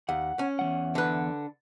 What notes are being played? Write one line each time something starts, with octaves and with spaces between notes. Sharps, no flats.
D#2 F#5
C#4
E2 G3 F#5
D3 B4